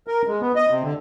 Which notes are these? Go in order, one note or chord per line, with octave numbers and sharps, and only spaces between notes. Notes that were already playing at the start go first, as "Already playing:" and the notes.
A#4
G#3
B3
D#5
C3
D3